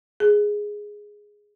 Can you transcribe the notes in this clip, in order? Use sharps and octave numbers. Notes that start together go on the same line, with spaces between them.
G#4